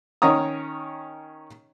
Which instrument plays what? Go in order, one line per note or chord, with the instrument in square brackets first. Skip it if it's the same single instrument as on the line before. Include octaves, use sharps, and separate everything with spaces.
[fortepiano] D#3 C#4 C#5 A#5 D#6